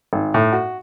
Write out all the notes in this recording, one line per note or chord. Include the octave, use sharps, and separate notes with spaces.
G#1
A2
F#4